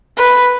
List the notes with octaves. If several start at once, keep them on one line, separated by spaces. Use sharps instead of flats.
B4